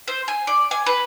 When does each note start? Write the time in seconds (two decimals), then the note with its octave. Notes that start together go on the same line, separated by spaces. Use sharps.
0.08 C5
0.28 G#5
0.47 D5
0.71 G#5
0.86 B4